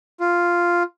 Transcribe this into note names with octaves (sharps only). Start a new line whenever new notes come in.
F4